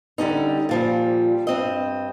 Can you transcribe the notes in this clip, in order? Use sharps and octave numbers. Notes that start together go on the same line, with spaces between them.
D3 G3 C#4 D#4
A#2 F3 G3
G2 C4 D#5